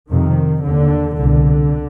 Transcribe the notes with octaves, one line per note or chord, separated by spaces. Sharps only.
F2 C3 D#3
D#2 D3
C2 B2 D3